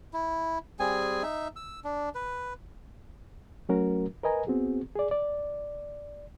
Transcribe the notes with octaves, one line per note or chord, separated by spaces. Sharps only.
E4
G3 C4 G#4 G#5
D#4 E5
E6
D4
B4
F#3 A3 C#4 F#4 A#4
A#4 B4 D#5 G#5 A#5
B3 C4 F#4 G#4
G#4 D5
D5